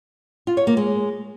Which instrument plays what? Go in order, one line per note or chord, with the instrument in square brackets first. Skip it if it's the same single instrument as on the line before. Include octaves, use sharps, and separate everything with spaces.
[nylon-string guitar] F4
C#5
A#3
G#3